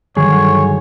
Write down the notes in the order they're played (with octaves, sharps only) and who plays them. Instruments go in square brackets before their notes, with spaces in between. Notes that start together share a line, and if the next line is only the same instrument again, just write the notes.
[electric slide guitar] G2 G#4 [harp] D3 D#3 F#3 [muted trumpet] C#5